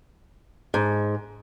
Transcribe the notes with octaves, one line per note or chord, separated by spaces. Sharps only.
G#2